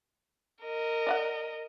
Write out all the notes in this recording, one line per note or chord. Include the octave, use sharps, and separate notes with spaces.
A#4 D#5
D5 F5 F#5